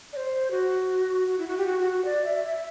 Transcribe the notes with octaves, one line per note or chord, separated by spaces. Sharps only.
D5
C5
F#4
F#4
E4
F#4
G4
F#4
F#4
F#4
D5
E5
E5